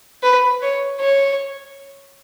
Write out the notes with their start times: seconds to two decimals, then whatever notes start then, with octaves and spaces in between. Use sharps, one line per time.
0.23 B4
0.62 C#5
1.00 C#5